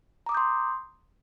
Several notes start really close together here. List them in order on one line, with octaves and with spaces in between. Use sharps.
A#5 D6 D#6 G6 C6